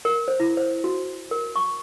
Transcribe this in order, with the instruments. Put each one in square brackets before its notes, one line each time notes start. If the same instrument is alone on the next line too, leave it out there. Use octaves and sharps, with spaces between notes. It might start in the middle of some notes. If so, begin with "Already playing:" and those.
[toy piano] A#4
C5
E4
C5
F#4
A#4
C#6